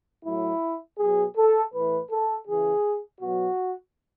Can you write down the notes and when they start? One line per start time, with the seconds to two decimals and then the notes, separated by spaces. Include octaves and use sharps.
0.25 A2 F#3 E4
0.99 B2 F#3 G#4
1.36 A4
1.73 A2 E3 B4
2.10 A4
2.48 C#3 E3 G#4
3.21 B2 F#3 F#4